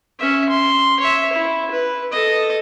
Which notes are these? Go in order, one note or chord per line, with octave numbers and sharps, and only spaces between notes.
C#4 E5
C6
C#5 E5
E4
B4
A4 D#5